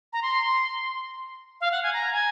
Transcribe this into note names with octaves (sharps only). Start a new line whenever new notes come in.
A#5
C6
F5
F#5
G#5
A#5
G#5